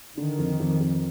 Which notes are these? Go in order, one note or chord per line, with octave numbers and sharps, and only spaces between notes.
D3 D#3
F2
F2
F2